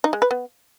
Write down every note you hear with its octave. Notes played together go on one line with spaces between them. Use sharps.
D#4
G#3
B4
B3